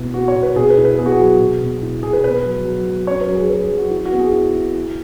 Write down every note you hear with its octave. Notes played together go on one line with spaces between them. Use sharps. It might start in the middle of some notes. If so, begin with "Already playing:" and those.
Already playing: B2 B3 E4
B3 F#4
C#5
B2
B4
B2 G#4
B4
E4
B4
B3 G#4
F#4
G#4
F#3
B2
B2
E4
B2 G#4
B4
B3 B4
F#3
F#3
F#3
C#4 C#5
B4
F#3
G#4
F#3 B4
G#4
F#3
F#4
E4
F#4
B3
G#4
E4
E4
E4